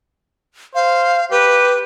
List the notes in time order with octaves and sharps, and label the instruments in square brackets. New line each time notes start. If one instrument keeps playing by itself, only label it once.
[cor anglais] C5 [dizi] F5
[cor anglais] G4 [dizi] B4